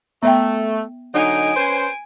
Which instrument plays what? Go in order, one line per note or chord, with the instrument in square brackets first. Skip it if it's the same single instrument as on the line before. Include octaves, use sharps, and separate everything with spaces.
[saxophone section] A3 [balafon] B3 E5 G5
[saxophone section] D3 F#3 D#4 [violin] G#5 D7
[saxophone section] C#4 B4 C5